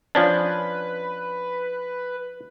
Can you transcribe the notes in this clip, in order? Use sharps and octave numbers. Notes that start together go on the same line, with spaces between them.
F3 C#4 D4 B4